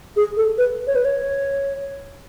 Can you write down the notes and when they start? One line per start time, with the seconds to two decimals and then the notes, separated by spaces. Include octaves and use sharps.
0.16 G#4
0.37 A4
0.58 B4
0.87 C#5
0.95 B4
1.05 C#5